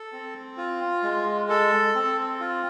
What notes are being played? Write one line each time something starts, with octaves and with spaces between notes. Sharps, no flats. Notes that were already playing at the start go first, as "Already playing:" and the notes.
Already playing: A4
C4
F4
G#3
A4
C4
F4